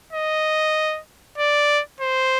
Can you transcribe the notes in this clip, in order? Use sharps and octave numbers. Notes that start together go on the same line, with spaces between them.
D#5
D5
C5